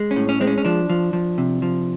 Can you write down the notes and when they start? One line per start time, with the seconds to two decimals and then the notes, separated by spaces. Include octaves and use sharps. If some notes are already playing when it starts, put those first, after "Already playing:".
Already playing: G#3
0.11 C#4
0.16 A2
0.29 C#4
0.41 G#3 C4
0.47 C#4
0.58 C#4
0.65 F3 D4
0.90 F3
1.13 F3
1.38 C3
1.62 F3